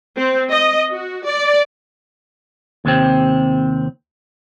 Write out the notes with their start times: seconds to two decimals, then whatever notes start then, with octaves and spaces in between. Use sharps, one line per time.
0.17 C4
0.52 D#5
0.91 F#4
1.27 D5
2.85 D#2 C3 C4